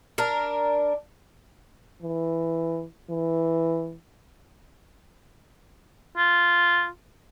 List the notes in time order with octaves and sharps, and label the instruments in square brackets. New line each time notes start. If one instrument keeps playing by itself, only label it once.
[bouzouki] D4 A#4
[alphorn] E3
E3
[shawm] F4